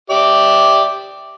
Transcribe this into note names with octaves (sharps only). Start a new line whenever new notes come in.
G4 D5 E5